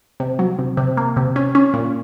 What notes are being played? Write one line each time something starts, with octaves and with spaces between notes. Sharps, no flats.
C3
F#3
C3
C3
A#3
C3
C#4
C#4
A#2